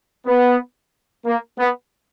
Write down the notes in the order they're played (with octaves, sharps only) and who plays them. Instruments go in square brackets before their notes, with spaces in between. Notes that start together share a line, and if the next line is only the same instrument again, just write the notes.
[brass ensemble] B3
A#3
B3